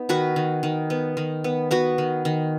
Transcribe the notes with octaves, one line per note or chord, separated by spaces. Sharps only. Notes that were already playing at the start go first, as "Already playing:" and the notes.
Already playing: B3 D#4
D#3 F#4 B4
D#3
D#3
B3
D#3
B3
B3 F#4 B4
D#3
D#3